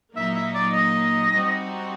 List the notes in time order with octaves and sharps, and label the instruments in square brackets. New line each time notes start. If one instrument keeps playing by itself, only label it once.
[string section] A#2 F#3 A#3 D#4 [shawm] E5
[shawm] E5
D5
D#5
[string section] G3 C4 D#4 F#4